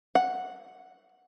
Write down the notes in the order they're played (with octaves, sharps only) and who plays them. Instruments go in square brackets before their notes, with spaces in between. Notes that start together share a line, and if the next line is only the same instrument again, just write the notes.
[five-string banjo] F#5